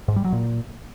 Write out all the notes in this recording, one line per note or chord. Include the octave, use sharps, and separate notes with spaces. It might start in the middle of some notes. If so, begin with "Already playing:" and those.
G#2
G3
F#3
A#2